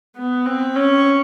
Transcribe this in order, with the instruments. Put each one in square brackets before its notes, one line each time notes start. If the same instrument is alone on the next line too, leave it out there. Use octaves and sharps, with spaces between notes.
[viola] B3
C4
C#4